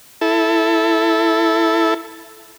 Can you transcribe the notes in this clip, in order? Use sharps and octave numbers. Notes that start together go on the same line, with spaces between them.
E4 A4